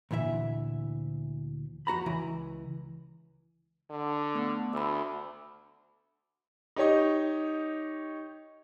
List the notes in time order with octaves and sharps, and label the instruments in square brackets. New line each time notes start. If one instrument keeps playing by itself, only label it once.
[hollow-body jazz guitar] D2 A#2 E3 E5
F2 F#4 A#5 B5
C#2 E3
[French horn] D3
[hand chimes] A3 B3
[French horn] D2 [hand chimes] B5 E6
[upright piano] D#4 G4 C#5 D#5